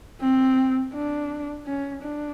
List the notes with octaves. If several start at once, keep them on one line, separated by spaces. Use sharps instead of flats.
C4
D4
C#4
D4